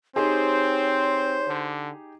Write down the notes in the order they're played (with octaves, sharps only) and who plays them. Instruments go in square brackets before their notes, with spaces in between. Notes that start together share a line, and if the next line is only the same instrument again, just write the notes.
[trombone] C4 [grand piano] D#4 G4 G#4 [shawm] C5 [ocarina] C#5
[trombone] D3